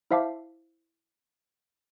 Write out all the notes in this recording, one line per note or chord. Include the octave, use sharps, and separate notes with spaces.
E4 C5 E5 F5 A5 D6